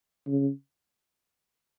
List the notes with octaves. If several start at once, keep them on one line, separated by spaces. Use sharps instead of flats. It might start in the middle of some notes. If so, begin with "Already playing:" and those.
C#3